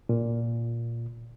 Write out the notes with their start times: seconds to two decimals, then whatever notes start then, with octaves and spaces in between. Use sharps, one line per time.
0.09 A#2